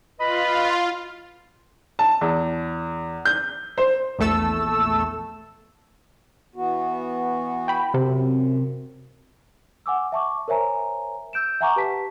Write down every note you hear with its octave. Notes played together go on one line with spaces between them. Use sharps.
F4 B4 D#5 B5
A5
E2
G6
C5
A#1 E2 A3 A4 E6
E3 B3 F#4
G5 B5
F#2 C3
F#5 G#5 D6 E6
E5 A5 C#6 D6
A#4 C5 C#5 E5 G#5 A#5
E6 G6 D7 E7
E5 F#5 G#5 A#5 C#6 D6
G4 B4 A5 B6